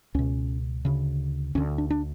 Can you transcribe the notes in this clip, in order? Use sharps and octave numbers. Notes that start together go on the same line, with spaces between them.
C#2 B2 C#4
D2 C#3
D2 D3 C#4
D4
D4